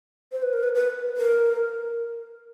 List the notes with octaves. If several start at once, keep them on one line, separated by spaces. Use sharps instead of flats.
C5
B4
A#4
B4
B4
A#4